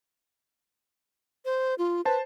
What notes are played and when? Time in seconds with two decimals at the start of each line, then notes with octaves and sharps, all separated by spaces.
1.45 C5
1.78 F4
2.05 B4 C5 A5